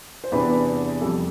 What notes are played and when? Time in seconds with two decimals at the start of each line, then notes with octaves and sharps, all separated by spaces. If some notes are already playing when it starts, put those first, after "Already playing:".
0.24 C5
0.32 E2 C3 E3 B3 D4 B4
1.01 F2 C3 G3 A4